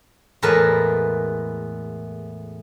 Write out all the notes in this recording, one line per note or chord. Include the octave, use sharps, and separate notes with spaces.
E2 A2 G#3 A#4 B4 A5